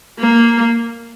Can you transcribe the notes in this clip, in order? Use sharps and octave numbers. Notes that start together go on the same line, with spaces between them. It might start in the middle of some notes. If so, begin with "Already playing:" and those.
A#3